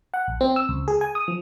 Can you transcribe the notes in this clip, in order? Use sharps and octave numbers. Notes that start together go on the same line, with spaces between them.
F#5
A#1
C4
E6
C#2
G#4
G#5
D#6
F3